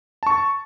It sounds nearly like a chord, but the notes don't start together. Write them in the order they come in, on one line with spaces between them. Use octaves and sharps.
A5 C#6 A6